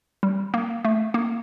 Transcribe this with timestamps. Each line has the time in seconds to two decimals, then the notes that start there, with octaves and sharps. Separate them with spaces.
0.23 G3
0.54 A#3
0.85 A3
1.14 A#3